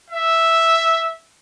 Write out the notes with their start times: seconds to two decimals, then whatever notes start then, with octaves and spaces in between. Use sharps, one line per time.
0.10 E5